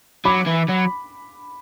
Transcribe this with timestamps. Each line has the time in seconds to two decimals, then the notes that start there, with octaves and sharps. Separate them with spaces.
0.25 F#3 B5 D6
0.46 E3
0.68 F#3